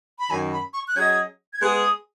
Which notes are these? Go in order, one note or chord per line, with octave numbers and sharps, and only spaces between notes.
B5
F#2 D#3 F#3 C#4 G#5
B5
C#6
F#6
F#3 C#4 G#4 D#5 G#6
G#6
G#3 B3 G#4 F#6
D#6